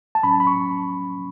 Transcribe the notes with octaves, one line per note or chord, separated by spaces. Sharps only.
A5
A2 F#3 C#4 B5
B5
C#6